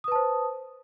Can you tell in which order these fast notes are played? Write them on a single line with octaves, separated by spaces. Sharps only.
D#6 B4 A5 C5